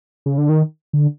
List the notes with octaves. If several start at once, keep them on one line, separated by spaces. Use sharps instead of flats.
C#3
D3
D#3
D3